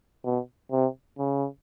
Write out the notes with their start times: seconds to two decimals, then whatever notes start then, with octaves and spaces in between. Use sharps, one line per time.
0.24 B2
0.72 C3
1.18 C#3